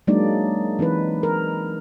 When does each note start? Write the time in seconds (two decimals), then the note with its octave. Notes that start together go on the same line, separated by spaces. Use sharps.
0.07 F#3 G#3 A#3 D4 D#4 D5
0.79 E3 C4 D#4 B4
1.23 A#4